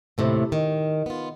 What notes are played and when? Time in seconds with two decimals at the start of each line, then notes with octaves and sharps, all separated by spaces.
0.18 D#2 A2 C3
0.52 D#3
1.06 B3 F4